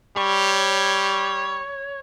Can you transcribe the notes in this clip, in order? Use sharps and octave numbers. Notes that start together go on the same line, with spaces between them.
G3 C#5